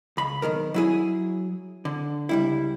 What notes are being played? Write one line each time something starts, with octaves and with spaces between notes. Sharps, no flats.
C#2 B5
B1 B2 D#3 A#4
F#3 E4 G#4
D3
C#2 G3 E4